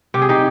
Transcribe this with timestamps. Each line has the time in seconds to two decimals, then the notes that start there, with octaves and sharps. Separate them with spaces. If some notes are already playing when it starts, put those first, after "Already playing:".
0.14 C3 G4
0.22 G#4
0.29 D#4 G4